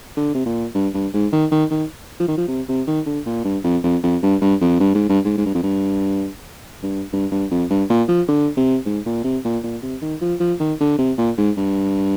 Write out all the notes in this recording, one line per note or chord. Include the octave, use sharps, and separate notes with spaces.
D3
C3
A#2
G2
G2
G#2
D#3
D#3
D#3
F3
D#3
F3
C3
C3
D#3
D3
A#2
G2
F2
F2
F2
G2
G2
F2
G2
G#2
G2
G#2
G#2
G2
F2
G2
G2
G2
G2
F2
G2
A#2
F3
D3
C3
G#2
A#2
C3
A#2
A#2
C3
D#3
F3
F3
D#3
D3
C3
A#2
G#2
G2